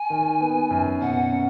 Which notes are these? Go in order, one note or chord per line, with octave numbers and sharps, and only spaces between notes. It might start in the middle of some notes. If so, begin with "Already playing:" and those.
Already playing: G#5
D#3
B3
F#2
B2 F#5
C#4